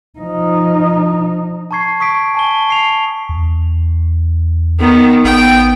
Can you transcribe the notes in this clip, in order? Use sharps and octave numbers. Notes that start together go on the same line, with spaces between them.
F3 D#4
A5 A#5 C#6 G#6 C7
C#6 D#6 B6 D7
G#5 A5 G7
C#6 C7 F7
E2
D#3 B3
A1 B3 G5